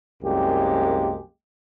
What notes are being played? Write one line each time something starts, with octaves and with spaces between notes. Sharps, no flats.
C2 F#2 G#3 A#3 G4